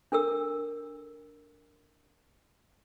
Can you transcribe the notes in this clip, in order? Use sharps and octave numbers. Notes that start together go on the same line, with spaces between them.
D4 A4 A#4 E6